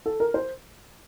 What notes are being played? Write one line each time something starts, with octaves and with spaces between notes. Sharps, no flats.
A4
A#4
C5